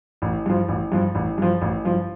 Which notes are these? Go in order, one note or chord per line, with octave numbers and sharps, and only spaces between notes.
A1
G2 F3
A1
G2 F3
A1
G2 F3
A1
G2 F3